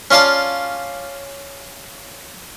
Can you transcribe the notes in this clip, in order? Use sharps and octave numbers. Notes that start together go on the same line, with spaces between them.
C#4 F4 D5 F5 A5